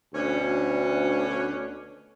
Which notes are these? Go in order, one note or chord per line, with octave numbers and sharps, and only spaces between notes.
D2 B2 C#4 D4